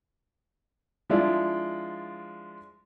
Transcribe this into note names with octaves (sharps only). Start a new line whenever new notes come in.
F3 G#3 D4 E4 F4 D5